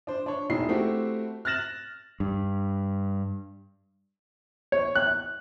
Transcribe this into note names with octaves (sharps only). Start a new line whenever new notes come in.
D4 C5
D4 C#5
E1 D#4 E4 C7
A3 C4 E4 F#4 G4
F6 F#6 A6 A#6 E7 F#7
G2
C#5
F#6